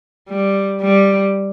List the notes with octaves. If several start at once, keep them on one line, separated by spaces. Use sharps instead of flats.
G3
G3